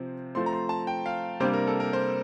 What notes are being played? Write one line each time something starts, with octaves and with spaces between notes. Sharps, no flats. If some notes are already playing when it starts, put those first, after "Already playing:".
Already playing: C3 F3 C4
F3 A3 C4 C6
A#5
C6
A5
G5
F5
C3 G3 A#3 D4 C5
A#4
A4
A#4
C5